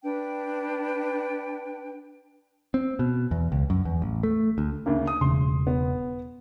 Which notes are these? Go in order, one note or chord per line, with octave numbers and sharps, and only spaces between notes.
D4 B4 G5
C4
B2
E2
C#2
F#2
E2
A1
A3
D2
D2 C#3 A#3
D#6
E1 C#3 C6
B3